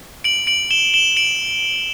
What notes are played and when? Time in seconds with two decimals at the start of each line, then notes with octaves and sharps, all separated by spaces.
0.24 D7 F#7
0.47 D7 F#7
0.70 E7 G7
0.94 E7 G7
1.16 D7 F#7